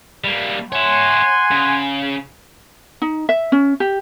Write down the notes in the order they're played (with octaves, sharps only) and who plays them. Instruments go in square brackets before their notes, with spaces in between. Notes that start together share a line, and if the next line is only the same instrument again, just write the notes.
[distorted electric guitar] G3 A#3
[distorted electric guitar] C#5 E5 [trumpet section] F#5 G#5 C6
[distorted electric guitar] C#3
[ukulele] D#4
E5
C#4
G4